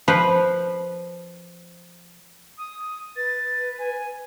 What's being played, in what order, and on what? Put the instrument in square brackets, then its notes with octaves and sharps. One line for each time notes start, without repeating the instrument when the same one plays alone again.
[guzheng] F3 B4 C5
[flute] D#6
[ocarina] B4 [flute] A6
[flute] G#5